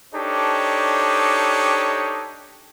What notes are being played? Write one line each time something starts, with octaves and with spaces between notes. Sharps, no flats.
D4 D#4 G4 A4 C5 C#5